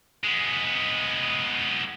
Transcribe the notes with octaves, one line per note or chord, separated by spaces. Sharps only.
G#3 B3